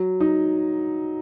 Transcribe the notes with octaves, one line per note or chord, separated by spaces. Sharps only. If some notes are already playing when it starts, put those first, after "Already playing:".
Already playing: F#3
D#4